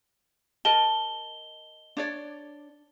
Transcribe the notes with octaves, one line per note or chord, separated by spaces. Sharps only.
A#4 D#5 A5 G7
D4 C#5 D5